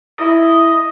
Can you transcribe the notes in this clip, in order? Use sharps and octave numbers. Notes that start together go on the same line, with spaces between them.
E4 D#5